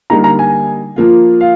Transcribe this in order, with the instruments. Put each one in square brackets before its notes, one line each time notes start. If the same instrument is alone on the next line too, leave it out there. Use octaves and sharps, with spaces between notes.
[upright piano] D3 G3 A#3 D#4 [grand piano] A#5
[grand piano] A#5
G#5
[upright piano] F3 A#3 F4
[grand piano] F5